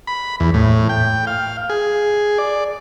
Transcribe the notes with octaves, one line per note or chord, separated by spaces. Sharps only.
B5
E2
A2
G5
F5
G#4
D5